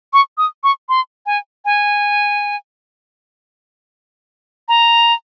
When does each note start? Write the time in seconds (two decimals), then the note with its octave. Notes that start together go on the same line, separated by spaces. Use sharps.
0.13 C#6
0.38 D#6
0.64 C#6
0.89 C6
1.26 G#5
1.65 G#5
4.68 A#5